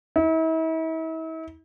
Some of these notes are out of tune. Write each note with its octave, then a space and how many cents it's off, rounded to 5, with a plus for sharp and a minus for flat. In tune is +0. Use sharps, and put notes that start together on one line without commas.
E4 -40